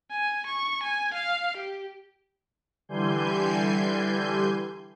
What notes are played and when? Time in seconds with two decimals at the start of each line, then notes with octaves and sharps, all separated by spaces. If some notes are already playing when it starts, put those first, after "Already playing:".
0.11 G#5
0.46 C#6
0.83 G#5
1.14 F5
1.57 G4
2.89 D3 E3 G3 G#5 C6 G6